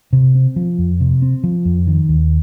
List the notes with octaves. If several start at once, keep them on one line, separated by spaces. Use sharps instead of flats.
C3
C4
F3
F2
C3
C4
F3
F2
D#3
D#2